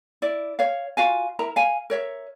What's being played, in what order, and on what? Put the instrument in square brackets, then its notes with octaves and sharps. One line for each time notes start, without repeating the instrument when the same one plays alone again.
[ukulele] E4 D5
C#5 F5
F4 F#4 F5 G#5
E4 A#4 A#5
F5 G#5
A#4 C#5 E5